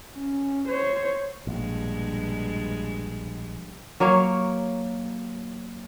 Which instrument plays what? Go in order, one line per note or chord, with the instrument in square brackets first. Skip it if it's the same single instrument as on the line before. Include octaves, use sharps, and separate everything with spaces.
[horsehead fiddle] C#4
C5 C#5
[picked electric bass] A#1 [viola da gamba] G2 B2 G#3
[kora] F#3 A#3 C#5 F5